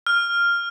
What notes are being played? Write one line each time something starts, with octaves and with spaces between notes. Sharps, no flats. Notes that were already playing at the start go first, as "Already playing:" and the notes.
F6